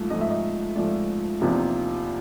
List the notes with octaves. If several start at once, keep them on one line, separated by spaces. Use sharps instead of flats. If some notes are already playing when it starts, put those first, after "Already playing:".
Already playing: G#2 F3 A3
G#2 F3 A3 D#5
E5
D#5
G#2 F3 A3 D5
E2 C3 F3 A#3 D#4